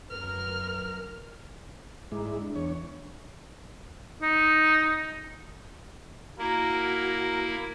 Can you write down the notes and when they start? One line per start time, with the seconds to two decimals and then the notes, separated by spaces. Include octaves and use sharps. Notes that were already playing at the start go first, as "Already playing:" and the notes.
0.11 F#2 A#4 B4 F6
2.12 G#2 G#3 E4 A#5 D6
2.26 D5
2.40 D4
2.56 E2 C#5
4.22 D#4
6.38 A#3 E4 F#4 A#4